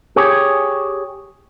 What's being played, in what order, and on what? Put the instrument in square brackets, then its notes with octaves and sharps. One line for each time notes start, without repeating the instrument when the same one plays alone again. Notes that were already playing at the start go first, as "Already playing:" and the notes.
[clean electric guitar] G4 G#4 C#5